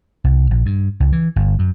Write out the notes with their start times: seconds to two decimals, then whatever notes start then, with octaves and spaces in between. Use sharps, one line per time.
0.24 C2
0.51 A#1
0.66 G2
1.00 C#2
1.12 E3
1.36 G1
1.59 F#2